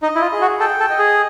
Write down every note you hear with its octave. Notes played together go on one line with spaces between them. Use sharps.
D#4 D#5
E4
F4
G#4
F#4
A4 G5
A4
D#5
G#4